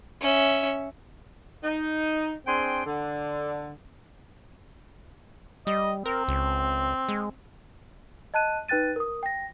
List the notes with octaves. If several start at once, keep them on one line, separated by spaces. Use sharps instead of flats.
C#4 E5
D#4
C4 D4 G#4 G5 C6
D3
G3 D#5
C4 A#4
C#2
G#3
D#5 A5 F#6 D#7
D#4 B4 G5 F#6 A6 D#7
A#4 D#6
G5 A#6